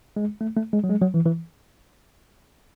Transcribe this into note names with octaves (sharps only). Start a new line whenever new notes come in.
G#3
A3
A3
G#3
F#3
G#3
F#3
E3
E3